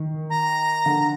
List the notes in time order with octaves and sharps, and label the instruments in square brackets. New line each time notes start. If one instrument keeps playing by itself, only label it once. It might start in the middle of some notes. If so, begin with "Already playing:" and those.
Already playing: [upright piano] D#3
[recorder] A#5
[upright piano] D3